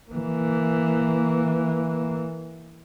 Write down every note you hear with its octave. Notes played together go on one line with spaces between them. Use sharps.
E3 A#3